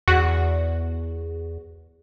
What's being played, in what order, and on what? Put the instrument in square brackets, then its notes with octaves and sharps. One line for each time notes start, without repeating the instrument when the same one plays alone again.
[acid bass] E2 [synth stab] F#4